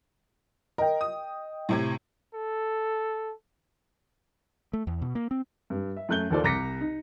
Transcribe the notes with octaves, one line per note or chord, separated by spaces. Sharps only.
A#4 D#5 G5
D#6
A2 C3 G#6
A4
A3
E2
B2
A#3
C4
G2
E5
F#2 A3 F#6 G6 G7
D#2 D#3 F4 A4 C5 D5
C2 A#5 D6 A#6 B6 C#7
D#4